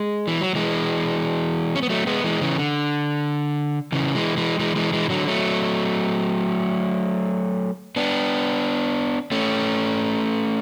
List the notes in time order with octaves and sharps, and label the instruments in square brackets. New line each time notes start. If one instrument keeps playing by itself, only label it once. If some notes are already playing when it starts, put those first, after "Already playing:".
Already playing: [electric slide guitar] G#3
E3
F#3
E3 G#3
C#4
B3
F#3 A3
G#3 B3
E3 G#3
C#3 E3
D3
C#3 E3
E3 G#3
E3 G#3
E3 G#3
E3 G#3
E3 G#3
D3 F#3
F#3 A3
B3 D4
A3 C#4